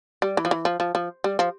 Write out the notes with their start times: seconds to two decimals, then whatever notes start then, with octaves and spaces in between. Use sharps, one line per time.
0.22 G3
0.37 E3
0.45 F3
0.51 E3
0.65 F3
0.80 F3
0.95 F3
1.24 G3
1.39 F3